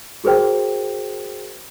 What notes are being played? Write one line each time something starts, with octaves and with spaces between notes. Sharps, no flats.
F#4 G#4 A#4 C5 G5